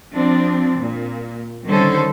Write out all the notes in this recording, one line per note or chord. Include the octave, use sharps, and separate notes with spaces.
F3 C4 D4
A#2
D3 D#3 G3 C#4 A4 C5